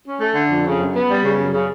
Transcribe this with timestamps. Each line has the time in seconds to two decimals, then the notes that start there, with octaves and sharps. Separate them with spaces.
0.06 C#4
0.20 A3
0.35 D3
0.50 F2
0.64 C#3
0.80 F#2
0.94 B3
1.09 G3
1.24 C#3
1.38 F#2
1.53 C#3